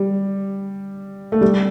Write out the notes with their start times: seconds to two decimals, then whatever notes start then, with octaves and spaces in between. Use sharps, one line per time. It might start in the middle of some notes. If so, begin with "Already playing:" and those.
Already playing: G3
1.32 A3
1.41 G3